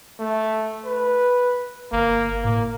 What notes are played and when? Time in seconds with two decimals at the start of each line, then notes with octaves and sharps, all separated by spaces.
0.20 A3
0.85 B4
1.92 G1 A#3
2.44 A2 A#3